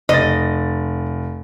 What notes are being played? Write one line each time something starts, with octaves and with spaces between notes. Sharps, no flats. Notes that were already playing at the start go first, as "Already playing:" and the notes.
F1 D#5 A6